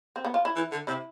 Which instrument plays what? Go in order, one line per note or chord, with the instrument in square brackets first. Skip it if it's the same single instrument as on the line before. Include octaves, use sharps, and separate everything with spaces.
[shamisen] C4
B3
F4
E4
[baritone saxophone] E3
D3
[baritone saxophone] C3 [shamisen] E4